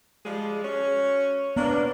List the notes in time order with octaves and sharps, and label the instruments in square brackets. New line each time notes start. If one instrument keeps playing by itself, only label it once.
[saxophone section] F3 G3 G#3
C#4 F#4 C#5
[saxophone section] A#3 C#4 D4 [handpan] B3